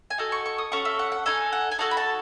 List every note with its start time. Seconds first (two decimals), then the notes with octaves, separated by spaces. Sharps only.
0.10 G#5
0.18 D#4 F#4 A4 A5
0.32 C#6
0.46 C#6
0.58 D#6
0.72 C#4 F#4 A4 C#6
0.85 E5
0.99 F#5
1.12 F#5
1.26 D#4 A4 G#5
1.53 F#5
1.71 G#5
1.79 D#4 F#4 A4 A5
1.91 B5
1.97 A5